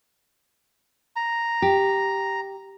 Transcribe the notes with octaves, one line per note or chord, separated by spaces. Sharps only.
A#5
G4